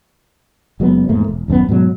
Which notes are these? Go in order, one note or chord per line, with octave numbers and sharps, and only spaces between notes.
F#1 F#3 G#3 B3
E2 G#2 A3 A#3
E1
D#1 F#2 F3 B3
G#2 B2 F#3 G#3